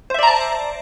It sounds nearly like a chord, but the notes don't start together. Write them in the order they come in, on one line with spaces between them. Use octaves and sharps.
C5 E5 D5 A#5 A5